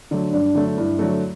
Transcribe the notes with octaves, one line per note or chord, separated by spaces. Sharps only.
D3 F#3 A3
G2 D4
D3 F#3 A3
G2 E4
D3 F#3 A3